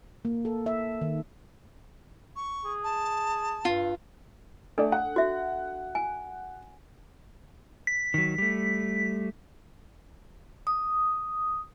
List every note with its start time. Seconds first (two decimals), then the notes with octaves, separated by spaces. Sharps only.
0.25 A#3
0.45 A4
0.66 E5
1.01 D#3
2.36 C#6
2.65 G#4
2.84 A5
3.65 G2 F4
4.78 A3 D4 A4 D5
4.92 F#5
5.16 F#4 E5
5.95 G#5
7.87 B6
8.14 D#3 F#3
8.38 G3 A3
10.67 D#6